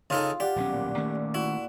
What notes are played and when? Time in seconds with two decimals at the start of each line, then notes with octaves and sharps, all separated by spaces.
0.10 C#3 D#4 F4 A4
0.40 G4 D5 F#5
0.56 D#1 B1 C#4
0.72 A#2
0.97 D#3 A3 C#4
1.34 E4 F#4